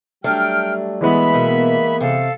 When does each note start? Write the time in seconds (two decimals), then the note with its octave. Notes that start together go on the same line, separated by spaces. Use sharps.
0.24 F#3 G3 A3 D4 G5 F6
1.01 E3 G#3 B3 E5 B5
1.34 B2 A#3
2.00 C3 A4 F5